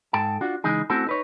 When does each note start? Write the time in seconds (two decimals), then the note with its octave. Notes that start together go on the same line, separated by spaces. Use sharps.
0.13 G#2 A4 G5 A5
0.41 D4 F4 F#4
0.64 C#3 E3 G#3 D#4 G#4
0.90 A3 C4 C#4 E4 F#4 A4
1.06 D#4 B4 C#5